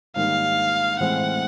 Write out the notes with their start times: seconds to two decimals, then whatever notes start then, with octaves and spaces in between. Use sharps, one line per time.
0.16 G#2 D#3 G3 A#3 F5
1.00 A2 E3 G#3 C4 F#5